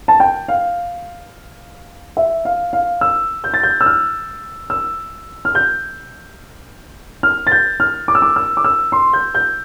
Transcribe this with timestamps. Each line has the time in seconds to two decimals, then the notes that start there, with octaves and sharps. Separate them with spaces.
0.08 A5
0.20 G5
0.48 F5
2.17 E5
2.45 F5
2.73 F5
3.01 E6
3.44 G6
3.54 A6
3.63 G6
3.81 E6
3.86 F6
4.70 E6
5.45 F6
5.55 G6
7.23 F6
7.47 A6
7.51 G6
7.80 F6
8.08 D6
8.15 E6
8.22 D6
8.36 E6
8.57 D6
8.64 E6
8.92 C6
9.13 G6
9.34 G6